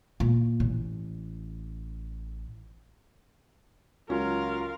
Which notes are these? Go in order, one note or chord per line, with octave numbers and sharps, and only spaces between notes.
A#2
A1
C#2 F#3 C#4 F4 A#4 F5